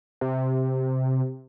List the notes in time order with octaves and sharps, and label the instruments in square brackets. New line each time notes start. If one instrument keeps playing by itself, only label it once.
[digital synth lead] C3